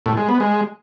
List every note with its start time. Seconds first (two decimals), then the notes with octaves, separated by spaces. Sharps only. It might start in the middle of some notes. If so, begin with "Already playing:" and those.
0.06 A2
0.17 G#3
0.29 B3
0.40 G#3